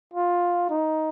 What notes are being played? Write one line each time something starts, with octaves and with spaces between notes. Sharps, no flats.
F4
D#4